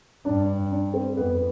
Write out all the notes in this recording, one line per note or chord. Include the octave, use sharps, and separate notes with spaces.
G2 D4
D4
C4
F2 B3